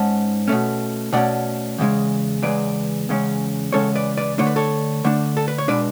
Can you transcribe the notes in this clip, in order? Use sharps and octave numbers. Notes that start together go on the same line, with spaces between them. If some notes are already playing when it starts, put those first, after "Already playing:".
Already playing: G#2 G#3 C#4 F#5 A5
B2 A3 C#4
B2 A3 C#4 D5 F#5
E2 C#3 G#3
E2 C#3 G#3 B4 D5
E2 C#3 G#3 C#4
E2 C#3 G#3 C#4 A4 C#5
B4 D5
B4 D5
D3 A3 D4 C#5
B4
A4 C#5
D3 A3 D4
A4
B4
C#5
B2 G#3 D4 B4 D5